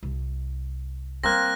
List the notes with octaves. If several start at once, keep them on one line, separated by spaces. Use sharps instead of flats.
C2
G3 A#3 C4 F#6 A#6